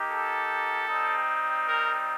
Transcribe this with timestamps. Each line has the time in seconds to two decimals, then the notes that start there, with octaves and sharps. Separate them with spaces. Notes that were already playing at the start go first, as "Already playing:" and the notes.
Already playing: A#3 D#4 G4
0.10 A4
0.88 G3 C4 D#4
1.67 A#4